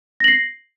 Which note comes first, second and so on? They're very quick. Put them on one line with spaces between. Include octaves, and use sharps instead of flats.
A#6 F#7 C7